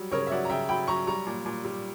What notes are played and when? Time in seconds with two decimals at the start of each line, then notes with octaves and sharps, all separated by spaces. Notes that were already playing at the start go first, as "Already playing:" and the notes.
Already playing: F#3 G3
0.12 C#3 A#4 C#5
0.27 E5
0.31 F#3 D5 F#5
0.45 A#5
0.50 C#3 E5 G5
0.69 F#3 G5 B5
0.88 F#3 A#5 C#6
1.07 G3 A#5 C#6
1.26 A#2
1.46 A#2
1.64 G3